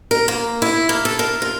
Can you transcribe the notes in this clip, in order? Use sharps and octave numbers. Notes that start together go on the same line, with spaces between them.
A#4
A#3
E4
A#3
A4
A#4
F4